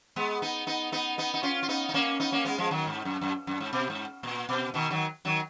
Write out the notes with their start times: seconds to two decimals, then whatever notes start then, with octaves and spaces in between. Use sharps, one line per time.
0.16 G#3 B3
0.42 B3 D#4
0.67 B3 D#4
0.92 B3 D#4
1.18 B3 D#4
1.34 D#4
1.43 C#4 F4
1.63 F4
1.69 B3 D#4
1.89 D#4
1.94 A#3 C#4
2.20 B3 D#4
2.32 A#3 C#4
2.45 G#3 B3
2.58 F3 G#3
2.71 D#3 F#3
2.87 G#2
3.05 F#2
3.21 F#2
3.47 F#2
3.60 G#2
3.73 B2
3.90 G#2
4.23 A#2
4.49 B2
4.74 B2 D#3
4.91 D#3 F#3
5.25 D#3 F#3